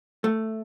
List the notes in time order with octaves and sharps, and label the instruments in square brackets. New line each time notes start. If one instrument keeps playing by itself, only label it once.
[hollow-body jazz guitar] A3